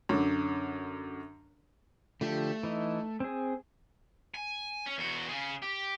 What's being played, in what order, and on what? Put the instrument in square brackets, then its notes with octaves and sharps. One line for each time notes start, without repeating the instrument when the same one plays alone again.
[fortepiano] F#2 D3
[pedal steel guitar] D3 F3 G4 [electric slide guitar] A3
[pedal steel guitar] E3 D#4
C4 G#4
[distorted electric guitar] G#5
C#4
E2 F#4
C#3 G#4
G4